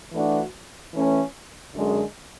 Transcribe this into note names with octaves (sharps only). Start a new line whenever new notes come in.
E3 A3 D4 F#4
E3 A3 C#4
F#2 D3 G#3